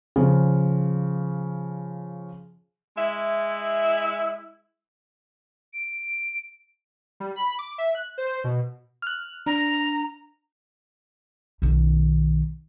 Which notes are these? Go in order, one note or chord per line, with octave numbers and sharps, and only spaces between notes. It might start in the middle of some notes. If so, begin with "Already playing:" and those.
C#3 F3
G#3 E4 E5
D7
G3
B5
D6
E5
F#6
C5
B2
F6 F#6
D4 A#5
B1 D#3